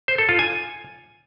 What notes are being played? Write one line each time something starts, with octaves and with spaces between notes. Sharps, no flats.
C5
A4
F4
G#5